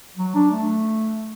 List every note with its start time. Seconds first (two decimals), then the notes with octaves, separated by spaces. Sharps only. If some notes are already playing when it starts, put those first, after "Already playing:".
0.17 F#3
0.34 D4
0.51 A3